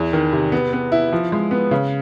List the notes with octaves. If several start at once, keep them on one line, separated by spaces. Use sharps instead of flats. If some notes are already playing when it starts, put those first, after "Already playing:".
Already playing: E2
D#3
C3
B3
B3
E4
F3
G#3
B3
C#3